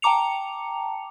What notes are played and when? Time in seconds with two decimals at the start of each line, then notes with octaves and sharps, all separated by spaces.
0.02 G5 A5 A#5 D6 C#7 F7